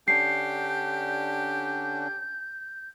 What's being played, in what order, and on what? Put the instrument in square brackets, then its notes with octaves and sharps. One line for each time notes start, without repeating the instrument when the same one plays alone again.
[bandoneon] D3 C#4 D4 [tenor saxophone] G4 [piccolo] G6 [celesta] C7